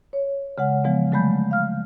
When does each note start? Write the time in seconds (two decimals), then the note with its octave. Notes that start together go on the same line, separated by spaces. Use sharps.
0.13 C#5
0.58 C#3 G#3 F#5
0.84 E3 F3 G#3 B3
1.12 D3 F#3 G#3 A3 B5 G6
1.51 F5 F6